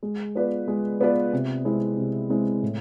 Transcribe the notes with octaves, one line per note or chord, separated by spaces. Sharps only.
G#3
B3 F4 B4 D5
G#3
B3 F4 B4 D5
C3
G#3 C4 E4
C3
G#3 C4 E4
A2